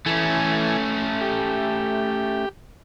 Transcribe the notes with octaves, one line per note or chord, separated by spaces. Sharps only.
E3 A3 C#4 G#5
G4